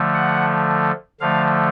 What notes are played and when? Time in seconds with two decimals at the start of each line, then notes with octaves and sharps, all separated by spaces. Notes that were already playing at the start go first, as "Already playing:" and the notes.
Already playing: D3 F3 A3
0.14 F#5
1.20 D3 F3 A3 F5